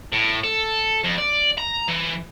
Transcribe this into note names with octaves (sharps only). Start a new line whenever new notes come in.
A2
A4
F2
D5
A#5
E3